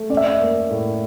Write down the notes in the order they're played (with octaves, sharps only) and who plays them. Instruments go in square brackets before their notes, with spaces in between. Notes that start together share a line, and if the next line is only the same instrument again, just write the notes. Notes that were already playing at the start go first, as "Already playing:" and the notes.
Already playing: [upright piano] A3
[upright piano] C#4 [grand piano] D5
[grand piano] E5
D5
[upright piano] A#3
A2